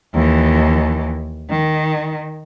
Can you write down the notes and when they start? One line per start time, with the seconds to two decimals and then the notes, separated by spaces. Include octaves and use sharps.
0.14 D#2 E3
1.50 D#3